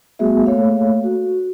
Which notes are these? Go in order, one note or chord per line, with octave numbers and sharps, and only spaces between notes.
G3 A3 B3 F#4 G#4 E5
A3 A#3 A4 C#5 F5
F#4